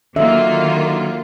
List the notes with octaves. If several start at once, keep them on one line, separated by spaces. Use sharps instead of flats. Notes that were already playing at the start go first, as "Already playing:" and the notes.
D3 D#3 F#3 A#3 D#4 F4 E5